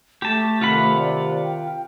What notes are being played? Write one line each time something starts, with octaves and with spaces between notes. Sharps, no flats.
A3 G4 A5
C3 D#3 F4 F#5 B5
D5
G5